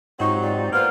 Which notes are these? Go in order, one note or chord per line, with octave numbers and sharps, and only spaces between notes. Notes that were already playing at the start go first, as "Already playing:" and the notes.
G#2 F#3 C4 D#4 F4 G4 C#6
D5
A#3 B3 F4 C5 F6